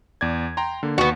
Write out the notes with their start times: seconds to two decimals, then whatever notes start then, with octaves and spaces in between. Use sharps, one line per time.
0.21 E2 D5 G#6
0.57 G5 A#5 C6
0.83 D3 A#3
0.98 D#2 B3 F#4